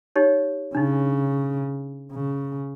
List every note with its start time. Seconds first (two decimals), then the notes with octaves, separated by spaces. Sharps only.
0.16 D#4 G4 C#5
0.75 C#3 D4 D#4
2.12 C#3